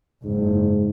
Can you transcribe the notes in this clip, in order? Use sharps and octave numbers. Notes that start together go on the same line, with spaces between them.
F#1 G#2